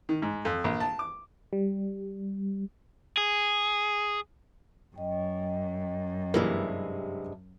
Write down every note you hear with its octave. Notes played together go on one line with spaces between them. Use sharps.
D#3
G#2
F2
A#1
A5
D6
G3
G#4
F#2 D#5 G5
G2 C3 E3 G#3 A#3